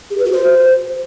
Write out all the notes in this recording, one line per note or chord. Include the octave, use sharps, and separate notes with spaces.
G#4
B4
F#4
C5